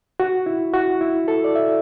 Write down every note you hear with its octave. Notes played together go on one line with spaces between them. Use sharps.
F#4
E4
F#4
E4
A4
D5
E5